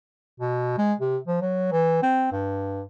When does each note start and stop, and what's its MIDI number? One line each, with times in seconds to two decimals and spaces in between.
0.40 0.74 47
0.78 0.94 56
1.00 1.17 48
1.28 1.40 53
1.42 1.68 54
1.72 1.99 52
2.03 2.30 60
2.32 2.82 43